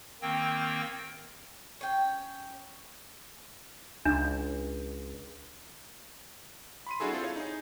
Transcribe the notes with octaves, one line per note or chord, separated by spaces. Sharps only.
D#3 A#3 C4 G5
C#4 G5
C#2 D4
B5 C6 D#7
G3 D4 E4 F#4 G#4 A4
C4 F4 A4 C5
E4 C#5 F5
D#4 G#4